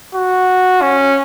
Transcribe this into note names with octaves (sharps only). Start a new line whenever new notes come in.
F#4
C#4